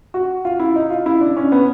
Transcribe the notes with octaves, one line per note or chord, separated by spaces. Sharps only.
F#4
F4
E4
D#4
F4
E4
D4
C#4
B3